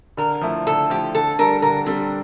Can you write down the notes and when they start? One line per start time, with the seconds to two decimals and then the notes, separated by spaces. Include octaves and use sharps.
0.17 D3 A#4
0.41 F3 A3 E4
0.67 D3 A4
0.90 F3 A3 E4 G4
1.15 D3 A4
1.39 G3 D4 A4 A#4
1.62 D3 A#4
1.86 G3 C4 D4 A4